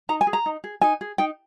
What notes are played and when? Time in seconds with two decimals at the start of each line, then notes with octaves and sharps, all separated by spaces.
0.09 D#4 A#5
0.21 G#5
0.27 G#4
0.33 A#5
0.46 D#4
0.64 G#4
0.81 D#4 G#5
1.01 G#4
1.18 D#4 G5